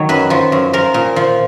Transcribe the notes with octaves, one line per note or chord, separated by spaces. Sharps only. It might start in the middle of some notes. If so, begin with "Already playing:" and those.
Already playing: D#3 F#3 C#5
F#2 B4
F3
F#2
F3 A#4
A#2
F3